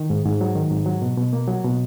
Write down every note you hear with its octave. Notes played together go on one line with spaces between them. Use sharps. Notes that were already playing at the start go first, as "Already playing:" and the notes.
Already playing: D#3
G#2
G#2
F#3
D#3
G#2
F#3
B2
B2
A#3
F#3
B2